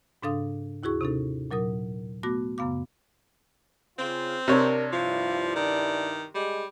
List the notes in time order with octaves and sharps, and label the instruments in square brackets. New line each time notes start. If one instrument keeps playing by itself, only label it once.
[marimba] G#2 C#3 D4 A4 F5 D#6
D#2 E4 F#4 G#4 C#6
C3 C#4 D#4 A4
A#2 F#3 A#4 D#6
A3 B3 F#4 D6 A#6
F#2 C#3 B3 F5 D6
[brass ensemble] C#3 F4 [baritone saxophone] C4
[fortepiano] C3 C#5 [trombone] D4 [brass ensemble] A#4
[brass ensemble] G2 E4 D5 [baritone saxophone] F3 [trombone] F4
[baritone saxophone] D#3 [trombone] D4
[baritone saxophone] G3 [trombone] G#3